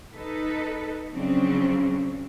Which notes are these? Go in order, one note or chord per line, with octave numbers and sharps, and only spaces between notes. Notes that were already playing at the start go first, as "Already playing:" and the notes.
D#4 A4 B4
C#3 F3 F#3 C4 D4